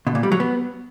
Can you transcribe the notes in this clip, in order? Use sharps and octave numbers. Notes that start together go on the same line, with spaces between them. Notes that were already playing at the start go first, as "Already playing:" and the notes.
B2
A#2
G3
F#3
B3